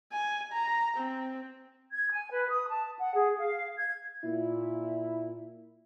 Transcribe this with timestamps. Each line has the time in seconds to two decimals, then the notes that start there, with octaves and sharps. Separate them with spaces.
0.12 G#5
0.52 A#5
0.98 C4
1.92 G#6
2.11 G#5
2.30 B4
2.49 D#6
2.67 A5
2.97 F#5
3.15 G#4
3.36 F5
3.77 G#6
4.24 A#2 E4